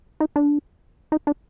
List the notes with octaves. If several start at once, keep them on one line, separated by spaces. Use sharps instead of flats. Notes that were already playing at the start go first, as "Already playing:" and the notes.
D#4
D4
D#4
D4